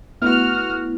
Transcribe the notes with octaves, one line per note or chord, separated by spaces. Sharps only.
A3 B3 E4 F#4 F6